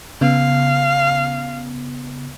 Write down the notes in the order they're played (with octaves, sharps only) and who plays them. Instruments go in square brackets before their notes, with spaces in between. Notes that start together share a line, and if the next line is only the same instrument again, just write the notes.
[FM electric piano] C#3 B3 [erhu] F5